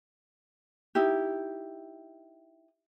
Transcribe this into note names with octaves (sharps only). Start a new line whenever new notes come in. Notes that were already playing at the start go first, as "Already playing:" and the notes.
D#4 E4 G4